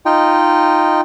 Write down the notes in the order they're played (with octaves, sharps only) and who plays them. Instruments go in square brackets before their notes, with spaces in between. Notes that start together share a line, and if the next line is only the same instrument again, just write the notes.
[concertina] D#4 F4 D#5 G5